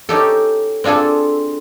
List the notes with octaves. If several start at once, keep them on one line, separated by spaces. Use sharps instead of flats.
C#4 D#4 G4 A4
C4 D4 F4 G#4 A4